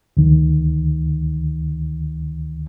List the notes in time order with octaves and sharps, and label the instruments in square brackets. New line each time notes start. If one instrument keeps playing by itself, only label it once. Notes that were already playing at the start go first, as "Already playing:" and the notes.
[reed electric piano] D2 D#3